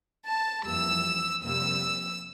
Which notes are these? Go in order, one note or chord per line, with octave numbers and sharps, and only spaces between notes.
A5
F2 E3 G3 A#3 E6
F2 C3 G3 A#3 E6